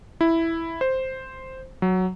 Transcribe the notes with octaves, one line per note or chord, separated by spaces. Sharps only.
E4
C5
F#3